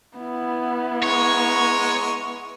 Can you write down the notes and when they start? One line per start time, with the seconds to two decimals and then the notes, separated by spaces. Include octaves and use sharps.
0.17 B3 E4
1.03 G#3 C#5 A#5 C#6